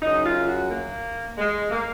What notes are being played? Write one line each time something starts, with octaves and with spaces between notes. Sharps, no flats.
F#2 C#3 D#4
F4
F#4
A#3
G#3
A#3